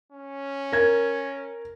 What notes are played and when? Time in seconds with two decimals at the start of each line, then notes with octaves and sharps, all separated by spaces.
0.12 C#4
0.72 A#4 G#6